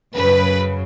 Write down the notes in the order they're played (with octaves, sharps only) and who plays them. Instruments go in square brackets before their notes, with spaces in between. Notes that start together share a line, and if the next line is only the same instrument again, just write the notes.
[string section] F#2 C#3 F#3 B4